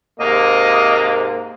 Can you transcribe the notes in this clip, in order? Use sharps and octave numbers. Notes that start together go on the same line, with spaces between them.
G#2 C3 A#3 D#5